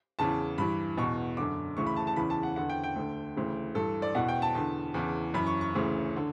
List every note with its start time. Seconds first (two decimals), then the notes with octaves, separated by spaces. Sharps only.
0.19 E2 C#3 E3 A5
0.58 G2 E3 B5
0.97 E2 B2 C#6
1.37 F#2 D3 D6
1.77 D2 C#3 E3 C#6
1.87 B5
1.96 A5
2.07 A5
2.16 E2 C#3 E3 B5
2.30 A5
2.43 F#5
2.56 E2 D3 F#5
2.70 G5
2.84 G5
2.96 D2 D3
3.36 D2 C#3 E3
3.75 G2 E3 A4
4.02 D5
4.15 E2 B2 F#5
4.29 G5
4.42 A5
4.55 E2 D3
4.94 E2 C#3 E3
5.34 F#2 E3 B5
5.47 C#6
5.61 C#6
5.74 D2 C#3 E3
6.17 D3